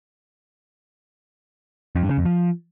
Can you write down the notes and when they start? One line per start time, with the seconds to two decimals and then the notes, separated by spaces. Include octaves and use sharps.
1.96 F2
2.03 G2
2.10 C#3
2.18 F2
2.25 F3